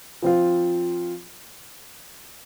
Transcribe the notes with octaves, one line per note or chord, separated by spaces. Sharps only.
F3 C4 F4